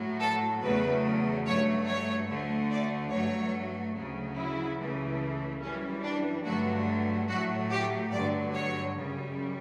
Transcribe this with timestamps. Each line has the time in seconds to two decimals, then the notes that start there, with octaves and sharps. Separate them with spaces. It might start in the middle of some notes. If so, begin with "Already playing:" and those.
Already playing: A2 F#3 A3
0.20 A4
0.62 E2 C#3 F#3 A3 B4
1.46 G2 F#3 A3 C#5
1.87 C#5
2.29 D2 D3 A3
2.71 D5
3.12 G2 F#3 A3 C#5
3.96 D2 C#3 F#3
4.37 E4
4.80 C#2 C#3 E3 A3
5.62 F#2 E3 G3 C#4
6.04 D4
6.45 G2 D3 F#3 A3 F#4
7.28 A2 F#3 A3 F#4
7.70 G4
8.12 G2 D3 F#3 D5
8.54 C#5
8.95 F#2 C#3 G3